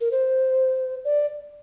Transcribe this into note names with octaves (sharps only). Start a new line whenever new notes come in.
A#4
C5
D5